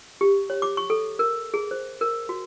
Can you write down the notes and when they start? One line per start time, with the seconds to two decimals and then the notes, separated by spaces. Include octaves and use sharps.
0.21 G4
0.50 C#5
0.62 D6
0.77 C#6
0.90 A4
1.19 A#4
1.54 G#4
1.71 C5
2.01 A#4
2.29 F#4